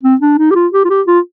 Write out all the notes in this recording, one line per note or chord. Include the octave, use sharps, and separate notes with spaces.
C4
D4
D#4
G4
F4
G4
F4
G4
F4